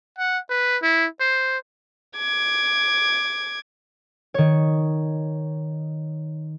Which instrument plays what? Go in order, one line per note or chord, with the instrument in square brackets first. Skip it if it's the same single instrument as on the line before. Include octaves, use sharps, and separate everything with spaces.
[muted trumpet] F#5
B4
E4
C5
[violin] D6 G#6
[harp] D#3 C#5